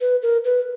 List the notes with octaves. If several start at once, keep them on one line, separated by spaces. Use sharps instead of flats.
B4
A#4
B4